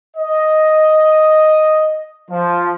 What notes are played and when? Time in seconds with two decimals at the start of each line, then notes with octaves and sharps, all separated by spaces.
0.17 D#5
2.31 F3